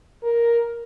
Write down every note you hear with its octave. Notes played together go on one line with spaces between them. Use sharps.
A#4